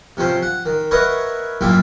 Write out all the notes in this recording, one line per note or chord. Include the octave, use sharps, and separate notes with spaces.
C3 F3 C#4 C5
F#5
D#3
A#4 B4 C#5 D#5 E5 F#5
F#2 A#2 G3 E4 F4